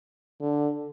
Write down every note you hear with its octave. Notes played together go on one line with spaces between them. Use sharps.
D3